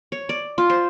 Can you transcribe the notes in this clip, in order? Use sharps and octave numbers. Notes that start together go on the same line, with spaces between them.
C#5
D5
F4
C5